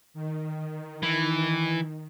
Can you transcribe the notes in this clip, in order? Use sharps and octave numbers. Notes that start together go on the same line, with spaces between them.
D#3
E3